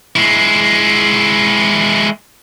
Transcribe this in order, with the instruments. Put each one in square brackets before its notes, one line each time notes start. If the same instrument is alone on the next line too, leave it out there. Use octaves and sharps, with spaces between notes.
[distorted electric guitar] G#3 E4